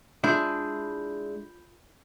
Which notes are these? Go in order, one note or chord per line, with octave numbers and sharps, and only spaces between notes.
G#3 D4 E4 F4 B5 G6